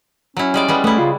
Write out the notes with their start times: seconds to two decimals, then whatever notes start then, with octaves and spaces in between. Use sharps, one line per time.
0.37 F#3 C#4 E4
0.54 G3 G#3 D5
0.68 G3 G#3 B3
0.84 A3 B3 E4
0.98 C#3 F4